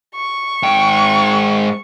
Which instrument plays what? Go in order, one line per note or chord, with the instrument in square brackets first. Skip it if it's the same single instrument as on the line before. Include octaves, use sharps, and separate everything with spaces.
[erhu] C#6
[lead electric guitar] G#2 G5